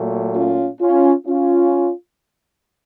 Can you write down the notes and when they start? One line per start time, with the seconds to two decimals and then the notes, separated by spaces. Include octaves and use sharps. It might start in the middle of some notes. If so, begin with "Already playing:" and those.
Already playing: A#2 F#3 A3
0.35 C#4 F4
0.81 C#4 F4
1.27 C#4 F4